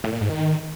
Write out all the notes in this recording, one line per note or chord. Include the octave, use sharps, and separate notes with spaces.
A2
A#2
G#2
D#3